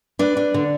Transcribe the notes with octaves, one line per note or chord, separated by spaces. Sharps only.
D4 B4 D5
D4
D3